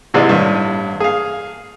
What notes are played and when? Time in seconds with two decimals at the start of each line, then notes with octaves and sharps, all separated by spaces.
0.14 G#2 C3 E3 G#3 D5
0.29 A1 G2
1.00 G#4 F5